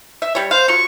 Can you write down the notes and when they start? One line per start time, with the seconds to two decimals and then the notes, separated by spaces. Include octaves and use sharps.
0.22 E5
0.35 G3 C#5
0.51 C5 F5
0.68 F#3 F4 C#6